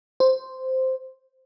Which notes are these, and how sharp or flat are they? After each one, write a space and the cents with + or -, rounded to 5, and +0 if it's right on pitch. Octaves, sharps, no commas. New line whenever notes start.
C5 -5